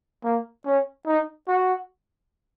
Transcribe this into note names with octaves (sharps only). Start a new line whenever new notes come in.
A#3
C#4
D#4
F#4